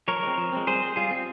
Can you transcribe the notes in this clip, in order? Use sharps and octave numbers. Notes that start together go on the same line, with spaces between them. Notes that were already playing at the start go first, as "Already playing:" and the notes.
F3 A#4 C#5
G#3 C4
F3
G#3 C4
G3 G#4 C5
C4
G3 F4 G#4
C4